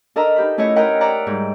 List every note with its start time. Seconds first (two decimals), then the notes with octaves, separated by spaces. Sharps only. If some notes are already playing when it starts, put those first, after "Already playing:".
0.16 D4 A4 A#4 D#5 E5 A#5
0.36 D#4 G4 B5
0.58 A3 C#4 E4 C#5 D#5
0.76 A#4 B4 D#5 F#5 G5 A#5
1.01 D5 E5 F#5 A#5
1.27 G#2 G3